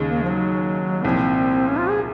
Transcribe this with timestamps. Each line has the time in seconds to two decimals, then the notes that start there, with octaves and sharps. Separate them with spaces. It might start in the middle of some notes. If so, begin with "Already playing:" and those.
Already playing: D#2 C#3 G#3
0.09 A#3
0.23 F3
0.30 F#3
1.04 C2 A#2 F3 C4
1.67 C#4
1.78 F4
1.89 G#4